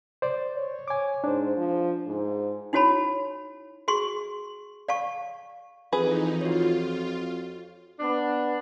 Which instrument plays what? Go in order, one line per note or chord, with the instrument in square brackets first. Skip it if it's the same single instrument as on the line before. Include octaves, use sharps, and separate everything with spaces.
[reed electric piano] C5 D5
[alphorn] C#5
[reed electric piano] G#5 D6
[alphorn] G#2 [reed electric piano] D4 C5
[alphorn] F3
G#2
[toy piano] D#4 E4 F#4 C#5 A5 B5
F#4 G#4 C6 C#6
D5 F5 A5 C#6
[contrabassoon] F2 [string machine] E3 D#4 [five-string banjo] G#4 B4
[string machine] F4 [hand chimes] F#4 C#5
[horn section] B3 D4